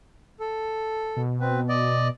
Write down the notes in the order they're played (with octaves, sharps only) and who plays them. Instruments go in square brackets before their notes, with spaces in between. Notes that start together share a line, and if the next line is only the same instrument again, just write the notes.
[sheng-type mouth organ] A4
[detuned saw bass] B2
[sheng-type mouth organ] C4 B4
D5 D#5